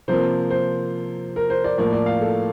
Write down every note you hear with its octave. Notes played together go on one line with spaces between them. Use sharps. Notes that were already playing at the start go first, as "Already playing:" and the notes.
C3 F3 A#3 C5
C5
A#4
C5
D5
A2 F3 A#3 D5
D5
F5
A4